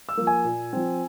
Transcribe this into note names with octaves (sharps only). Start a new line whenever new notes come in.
E6
F3 A#3
G#5
A#2
F3 C4